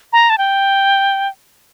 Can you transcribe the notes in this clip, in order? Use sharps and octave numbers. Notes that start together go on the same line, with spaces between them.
A#5
A5
G5